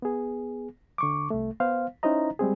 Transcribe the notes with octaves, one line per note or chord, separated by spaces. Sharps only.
B3 G#4
D3 C#6 D6
C2 A3
B3 C5 F5
C#4 D#4 E4 C5 D#5 A#5
G3 G#3 C4 G#4